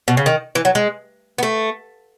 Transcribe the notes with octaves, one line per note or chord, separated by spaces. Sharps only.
B2
C#3
D#3
E3
F#3
G#3
B3
A3